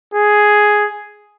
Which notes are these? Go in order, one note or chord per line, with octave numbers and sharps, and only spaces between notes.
G#4